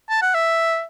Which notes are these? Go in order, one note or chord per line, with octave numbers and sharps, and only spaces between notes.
A5
F#5
E5